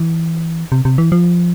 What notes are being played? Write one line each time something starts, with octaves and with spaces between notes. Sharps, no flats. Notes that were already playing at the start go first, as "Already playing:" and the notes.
Already playing: E3
C3
C3
E3
F3